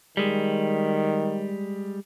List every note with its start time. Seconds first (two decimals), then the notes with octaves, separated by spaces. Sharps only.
0.17 D#3 G3 G#3